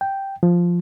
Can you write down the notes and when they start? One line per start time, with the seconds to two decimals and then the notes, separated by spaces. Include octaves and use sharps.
0.01 G5
0.43 F3